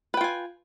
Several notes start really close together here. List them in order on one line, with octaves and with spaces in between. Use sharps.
B4 G5 F4 G#5